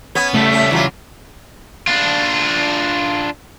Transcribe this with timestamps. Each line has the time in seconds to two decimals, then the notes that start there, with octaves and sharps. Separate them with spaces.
0.15 B3 C#4 G#6
0.34 C#3 G3 A3 E5
0.52 C#4
0.71 E3 F#3 F4
1.87 D4 F4